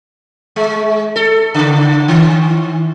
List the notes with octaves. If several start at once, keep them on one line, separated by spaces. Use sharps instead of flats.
G#3
A4
C#3
D#3